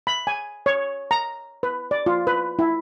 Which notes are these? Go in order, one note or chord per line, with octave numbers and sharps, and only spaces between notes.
B5
G#5
C#5
A#5
B4
D5
F4
B4
E4